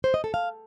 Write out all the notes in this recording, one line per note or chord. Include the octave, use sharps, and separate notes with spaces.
C5
D#5
A4
F5